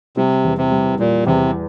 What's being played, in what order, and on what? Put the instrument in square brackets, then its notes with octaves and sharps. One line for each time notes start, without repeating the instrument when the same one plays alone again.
[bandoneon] C3 [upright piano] G3
[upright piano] E2
[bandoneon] C3
[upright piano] G3
[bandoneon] A#2 [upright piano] G3
[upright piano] E2 [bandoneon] C3